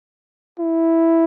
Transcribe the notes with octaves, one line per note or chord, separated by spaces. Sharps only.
E4